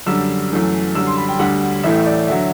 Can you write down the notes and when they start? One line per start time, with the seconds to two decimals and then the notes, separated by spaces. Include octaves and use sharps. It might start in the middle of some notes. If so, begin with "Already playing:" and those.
0.06 F#2 D3 G3 E6
0.51 F#2 E3 A3
0.95 F#2 D3 G3 E6
1.07 C6
1.17 B5
1.29 G5
1.39 D2 D3 G3 F#5
1.84 A1 A2 E3 A3 E5
2.06 D5
2.28 D3 F#3 E5